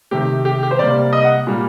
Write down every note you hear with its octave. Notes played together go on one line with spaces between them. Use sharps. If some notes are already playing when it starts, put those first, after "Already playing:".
C3 D#3 A3 G4
G4
G4
C5
C3 G3 A#3 D5
D#5
F#5
A#2 G3 A#3